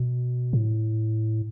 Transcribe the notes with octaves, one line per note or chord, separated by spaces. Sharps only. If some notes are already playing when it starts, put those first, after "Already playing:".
Already playing: B2
A2